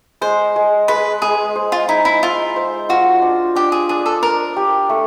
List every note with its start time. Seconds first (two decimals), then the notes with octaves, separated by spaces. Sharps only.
0.21 G#3 C5
0.56 G#3
0.88 G#3 B4
1.22 G#3 G#4
1.56 C5
1.72 F4
1.88 D#4 E4
2.05 E4
2.23 F4 E5
2.56 C5
2.89 F4 F#4
3.22 D4
3.55 D4 G4
3.72 G#4
3.89 D4 G#4
4.06 A4
4.22 D4 A#4
4.57 G4
4.89 A3